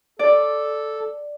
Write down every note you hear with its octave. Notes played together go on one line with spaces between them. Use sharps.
A4 D5